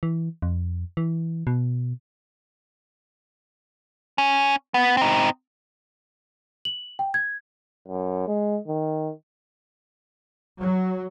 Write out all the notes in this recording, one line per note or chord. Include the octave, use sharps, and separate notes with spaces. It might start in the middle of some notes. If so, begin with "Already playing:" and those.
E3
F2
E3
B2
C#4
B3
C4 D#4
F#7
G5
G#6
F#2
G#3
D#3
F#3